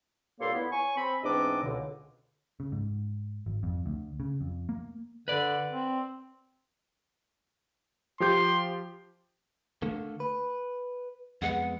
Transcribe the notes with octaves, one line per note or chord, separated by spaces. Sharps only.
G2 A#2 A#3 A4 C#5 C6
B3 E4
C#5 G#5 C#6
C4 B5
E2 G#2 C4 D4 D#5 D6
C#2 B2 D3
C#3
G#2
G#1
F2
D2
C#3
F2
A#3
D3 B4 D5
C4
F3 G4 C6 G6
D3 A3 A#3
B4
F2 G#3 B3 F#5